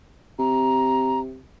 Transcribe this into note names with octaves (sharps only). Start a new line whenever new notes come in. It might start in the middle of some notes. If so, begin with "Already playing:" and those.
C3 A#5